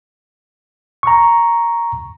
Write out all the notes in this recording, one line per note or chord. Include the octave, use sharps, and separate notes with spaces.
A#5 C#6